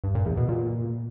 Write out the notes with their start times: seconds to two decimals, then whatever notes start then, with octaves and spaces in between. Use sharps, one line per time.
0.04 G2
0.15 A#2
0.26 E2
0.37 B2
0.49 A#2